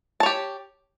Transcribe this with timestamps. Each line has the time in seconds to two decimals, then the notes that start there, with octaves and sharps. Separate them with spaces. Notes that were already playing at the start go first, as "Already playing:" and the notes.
0.20 A5
0.23 C#5
0.26 G4